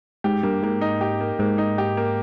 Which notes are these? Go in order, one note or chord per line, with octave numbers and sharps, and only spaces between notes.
G#2 G4
G2 A#3
G#2 A#3
D#4
G4
A#3
G#2 A#3
D#4
G4
A#3